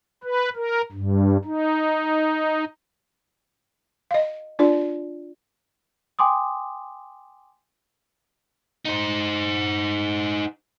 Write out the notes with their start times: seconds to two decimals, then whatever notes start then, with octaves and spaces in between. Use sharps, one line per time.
0.23 B4
0.56 A#4
0.92 G2
1.45 D#4
4.11 D#5 F5
4.59 D4 F4 D5
6.19 G5 G#5 C6 D6 D#6
8.85 D#4 C5